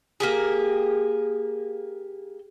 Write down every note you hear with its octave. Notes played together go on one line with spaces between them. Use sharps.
A#3 G4 G#4